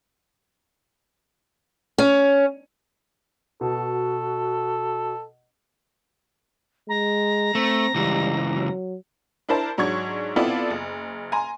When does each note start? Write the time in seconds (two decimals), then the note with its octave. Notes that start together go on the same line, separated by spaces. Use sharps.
1.98 C#4
3.61 B2 F#4 A4
6.88 G#3 A#5
7.55 A3 C4
7.95 C#2 E3 G3
8.53 F#3
9.49 D4 E4 A#4 C5 A5
9.78 G#2 F#3 D4 C#6 G#6
10.36 B3 C4 E4 F4 A4 D5
10.70 F#1
11.32 G#5 A#5 C6